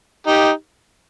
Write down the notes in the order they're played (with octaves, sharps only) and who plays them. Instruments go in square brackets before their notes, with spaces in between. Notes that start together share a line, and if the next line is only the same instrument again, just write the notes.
[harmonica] D#4 G4